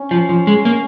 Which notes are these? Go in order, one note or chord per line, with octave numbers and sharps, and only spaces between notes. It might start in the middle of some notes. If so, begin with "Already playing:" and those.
Already playing: C#4
F3
F3
G#3
A#3